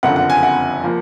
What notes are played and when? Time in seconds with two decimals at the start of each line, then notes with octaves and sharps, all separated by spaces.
0.03 F#1 F2 D3 F3 F#5
0.16 F#5
0.30 G#5
0.43 F#5
0.83 F3 A#3